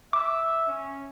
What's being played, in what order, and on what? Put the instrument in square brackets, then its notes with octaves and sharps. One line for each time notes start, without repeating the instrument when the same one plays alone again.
[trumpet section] E5 [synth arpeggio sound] D6
[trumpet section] C#4